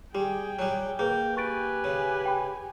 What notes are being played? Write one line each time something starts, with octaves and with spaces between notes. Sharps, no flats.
G3 G4 G#4 G5
F#3 G3
A#3 G#4 B4 G5
G4 B4 G#5 C#6 A6 D7
C#3
G5 B5